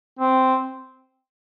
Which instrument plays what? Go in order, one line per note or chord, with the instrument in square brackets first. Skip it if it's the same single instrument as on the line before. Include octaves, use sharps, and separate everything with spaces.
[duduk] C4